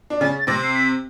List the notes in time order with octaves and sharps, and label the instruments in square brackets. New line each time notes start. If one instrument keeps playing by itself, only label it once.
[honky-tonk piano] D4
[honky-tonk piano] C#3 C#4 [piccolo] A6
[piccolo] A6
[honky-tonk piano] C3 C4 [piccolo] A#6
[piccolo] C7
B6